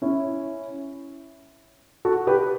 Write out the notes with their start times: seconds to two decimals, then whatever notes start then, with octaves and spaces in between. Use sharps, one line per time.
0.02 C#4 E4
2.05 F#4 A4
2.27 G4 B4